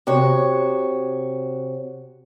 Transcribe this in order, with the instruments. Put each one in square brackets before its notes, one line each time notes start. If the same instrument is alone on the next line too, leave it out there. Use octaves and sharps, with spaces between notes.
[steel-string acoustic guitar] C3 F#4 C#5